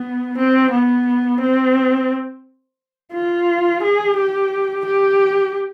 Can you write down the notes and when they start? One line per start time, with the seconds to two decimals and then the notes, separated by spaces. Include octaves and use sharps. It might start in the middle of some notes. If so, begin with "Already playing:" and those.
Already playing: B3
0.37 C4
0.71 B3
1.41 C4
3.13 F4
3.83 G#4
4.16 G4
4.86 G4